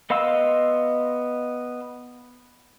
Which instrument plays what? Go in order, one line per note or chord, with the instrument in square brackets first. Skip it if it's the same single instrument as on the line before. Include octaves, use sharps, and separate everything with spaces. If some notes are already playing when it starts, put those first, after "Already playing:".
[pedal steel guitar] B3 D#5 F5 C6 E6